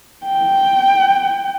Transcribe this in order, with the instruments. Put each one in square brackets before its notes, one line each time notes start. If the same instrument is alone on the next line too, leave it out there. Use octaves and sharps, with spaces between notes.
[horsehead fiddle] G5